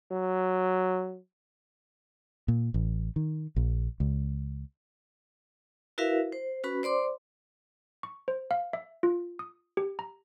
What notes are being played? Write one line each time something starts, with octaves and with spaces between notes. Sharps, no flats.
F#3
A#2
A1
D#3
A#1
C#2
E4 F#4 A#4 B4 E5 F5
C5
C#4 F#4 B4 B5
C5 D5 C6 D6
C#6
C5
F5
E5
F4
D#6
G4
A#5